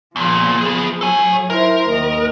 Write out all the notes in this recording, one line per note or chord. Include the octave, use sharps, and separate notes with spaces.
E2 A#2 F3
B3 G#4
F#3 A4 C#5 G#5
E4 A#4 C5
D#2 D#5